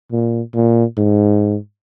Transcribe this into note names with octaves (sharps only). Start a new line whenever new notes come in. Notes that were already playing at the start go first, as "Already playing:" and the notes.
A#2
A#2
G#2